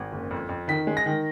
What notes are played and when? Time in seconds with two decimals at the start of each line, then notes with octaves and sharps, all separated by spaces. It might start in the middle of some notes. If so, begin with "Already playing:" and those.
Already playing: G#1
0.12 F#1
0.31 F2
0.49 F2
0.68 D#3 B6
0.87 G#3
0.97 A#6
1.06 D#3